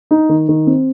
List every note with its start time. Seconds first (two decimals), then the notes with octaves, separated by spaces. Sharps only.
0.11 D#4
0.29 D#3
0.49 D#3
0.67 C4